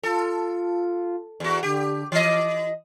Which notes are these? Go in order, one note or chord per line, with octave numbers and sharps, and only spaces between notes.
F4 A4
E2 F#4
D3 G4
E3 D#5 D6